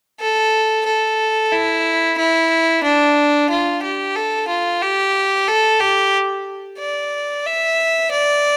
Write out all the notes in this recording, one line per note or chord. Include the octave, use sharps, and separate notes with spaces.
A4
A4
E4
E4
D4
F4
G4
A4
F4
G4
A4
G4
D5
E5
D5